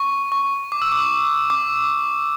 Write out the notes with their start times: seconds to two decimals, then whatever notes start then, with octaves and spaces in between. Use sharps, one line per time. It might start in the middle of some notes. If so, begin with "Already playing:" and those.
Already playing: C#6
0.32 C#6
0.72 D6
0.82 E6
0.92 D6
1.50 D6